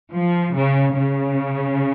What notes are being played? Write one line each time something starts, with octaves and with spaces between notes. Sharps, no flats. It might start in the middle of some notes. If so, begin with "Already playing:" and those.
F3
C#3
C#3